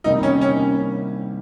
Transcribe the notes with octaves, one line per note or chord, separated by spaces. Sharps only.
C2 C3 D#3 G3 A#3 D#4
C#4
C#4